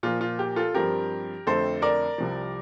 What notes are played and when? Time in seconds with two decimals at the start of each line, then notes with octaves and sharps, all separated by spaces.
0.03 A#2 F3 A#3 F4
0.21 F4
0.39 G4
0.56 F4 A4
0.74 G2 F3 C4 G4 A#4
1.47 F2 D3 A3 C4 A4 C5
1.82 A#4 D5
2.18 C2 C3 F3